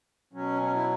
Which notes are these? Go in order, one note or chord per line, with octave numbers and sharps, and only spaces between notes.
B2 F#3 C#4
C#4
E4